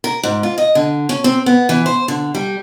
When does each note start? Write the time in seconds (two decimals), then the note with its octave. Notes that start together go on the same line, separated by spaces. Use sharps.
0.04 A#4
0.23 G#2
0.43 F4
0.58 D#5
0.75 D3
1.09 C#4
1.24 C4
1.46 B3
1.69 E3
1.86 C5
2.08 D3
2.35 G3